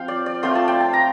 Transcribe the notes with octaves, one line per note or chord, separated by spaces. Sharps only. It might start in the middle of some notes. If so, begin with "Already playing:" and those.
Already playing: F3 C4 F5 G5
D5
D5
F3 A3 C4 F4 C6
A5
G5
A5
A#5